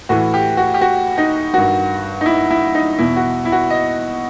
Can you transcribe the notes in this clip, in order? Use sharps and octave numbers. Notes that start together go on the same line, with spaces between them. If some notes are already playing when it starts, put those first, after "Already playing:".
A2 E3 F#4
G4
F#4
G4
F#4
D#4
G2 D#3 F#4
D#4
E4
E4
D#4
E2 B2 E4
F#4
E4
F#4
D#5